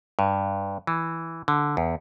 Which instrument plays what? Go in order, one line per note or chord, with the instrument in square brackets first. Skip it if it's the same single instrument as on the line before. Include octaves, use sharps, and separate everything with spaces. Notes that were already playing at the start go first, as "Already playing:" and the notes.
[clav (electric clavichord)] G2
E3
D3
E2